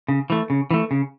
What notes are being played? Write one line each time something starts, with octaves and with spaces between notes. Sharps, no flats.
C#3
E3 A3
C#3
E3 A3
C#3